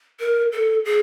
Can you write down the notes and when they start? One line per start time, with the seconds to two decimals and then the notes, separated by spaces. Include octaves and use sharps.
0.20 A#4
0.52 A4
0.85 G#4